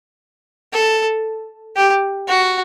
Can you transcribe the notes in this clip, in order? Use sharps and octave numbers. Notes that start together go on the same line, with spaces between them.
A4
G4
F#4